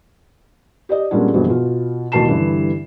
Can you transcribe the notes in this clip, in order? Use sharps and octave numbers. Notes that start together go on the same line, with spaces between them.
G4 D5 D#5
A#2 G3 G#3 B3 C#4 D4
E1 A#1 G2 B2 G#4
B2 F4
A1 D#2 B2 A5 C7 E7
G2 D3 E3 G3